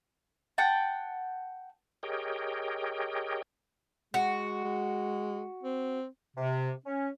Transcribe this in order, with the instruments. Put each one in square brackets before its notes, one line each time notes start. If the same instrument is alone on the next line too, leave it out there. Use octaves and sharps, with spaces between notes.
[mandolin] F#5 G5 A5
[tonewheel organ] G4 G#4 A#4 C#5 D#5 G5
[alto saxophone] G#3 [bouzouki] F#4
[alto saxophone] G#3
C4
[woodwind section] C3
C#4